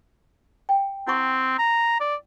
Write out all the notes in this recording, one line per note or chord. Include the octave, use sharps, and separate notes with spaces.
G5
C4 E4 F#5 C#6
A#5
D5